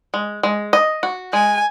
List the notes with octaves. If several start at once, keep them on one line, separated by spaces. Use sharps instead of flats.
G#3
G#3
D#5
F#4
G#3 G#5